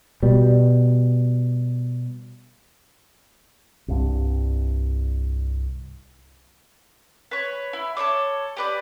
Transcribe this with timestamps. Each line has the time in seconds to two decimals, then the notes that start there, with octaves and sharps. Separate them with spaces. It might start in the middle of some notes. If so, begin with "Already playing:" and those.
0.23 B2 G3
3.88 C2 G2
7.31 B4 C#5
7.73 E4
7.97 A4 C#5 D5 D6
8.57 G4 B4 D5